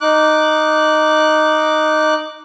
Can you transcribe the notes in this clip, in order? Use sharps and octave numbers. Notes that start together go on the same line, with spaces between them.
D#4 D6 F#6